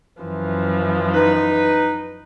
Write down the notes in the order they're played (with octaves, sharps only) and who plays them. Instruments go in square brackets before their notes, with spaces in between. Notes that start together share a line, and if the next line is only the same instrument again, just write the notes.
[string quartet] F#2 E3 F3
[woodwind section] D#4 B4